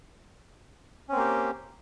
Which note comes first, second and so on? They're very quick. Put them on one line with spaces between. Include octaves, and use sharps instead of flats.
C#4 C4 A#3 G4